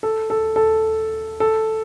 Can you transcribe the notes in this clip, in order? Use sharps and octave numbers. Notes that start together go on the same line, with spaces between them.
A4
A4
A4
A4